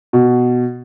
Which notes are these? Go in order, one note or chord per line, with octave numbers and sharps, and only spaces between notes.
B2